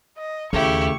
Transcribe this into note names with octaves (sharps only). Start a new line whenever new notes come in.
D#5
D#2 C#3 A3 E4 G4 C#6